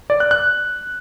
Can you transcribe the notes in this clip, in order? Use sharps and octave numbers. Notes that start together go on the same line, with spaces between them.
D5
F#6
F#6